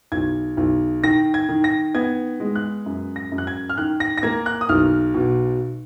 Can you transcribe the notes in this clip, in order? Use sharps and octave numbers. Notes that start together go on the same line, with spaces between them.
B1 G#6
B1
D#3 A#6
G#6
D#3
A#6
B3 G#6
G#3
F#6
F#2
A#6
F#2
F#6
G#6
F6
D#3 F#6
A#6
A#6
A#3 G#6
F#6
D#6
B1 F6
B2